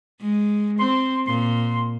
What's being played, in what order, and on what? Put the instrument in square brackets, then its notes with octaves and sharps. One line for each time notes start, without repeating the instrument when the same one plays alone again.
[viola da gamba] G#3
[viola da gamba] C4 [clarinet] C6
[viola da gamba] A#2 [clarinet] C6